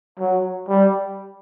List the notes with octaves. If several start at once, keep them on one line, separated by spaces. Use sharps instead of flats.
F#3
G3